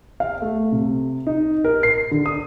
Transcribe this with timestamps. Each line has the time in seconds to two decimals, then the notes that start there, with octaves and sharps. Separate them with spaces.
0.20 F5
0.42 A3
0.72 C3
1.27 D#4
1.64 A#4
1.83 C7
2.11 D3
2.26 D#6